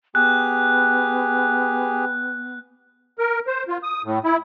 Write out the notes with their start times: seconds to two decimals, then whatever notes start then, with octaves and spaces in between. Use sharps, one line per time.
0.15 B3 G4 G#4 F#6
3.19 A#4
3.47 C5
3.68 F4
3.83 D#6
4.04 A2
4.24 E4